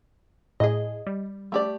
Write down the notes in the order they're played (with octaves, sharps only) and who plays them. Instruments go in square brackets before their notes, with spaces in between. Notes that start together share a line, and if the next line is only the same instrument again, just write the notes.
[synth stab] A2 G#4 [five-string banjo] D#5
[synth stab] G3
[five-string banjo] A3 G4 D5